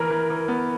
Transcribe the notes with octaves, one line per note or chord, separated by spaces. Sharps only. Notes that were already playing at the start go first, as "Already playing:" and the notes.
Already playing: E3 A#4
E3
E3
B3